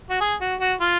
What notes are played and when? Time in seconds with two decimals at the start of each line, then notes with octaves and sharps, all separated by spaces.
0.10 F#4
0.21 G#4
0.41 F#4
0.60 F#4
0.81 F4